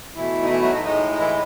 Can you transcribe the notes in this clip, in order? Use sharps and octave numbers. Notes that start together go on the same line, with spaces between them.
B2 E3 A3 E4
D#4
E3 E4
F#3 F#4
D#4
A2 G#3 D#4
D#4
E3 E4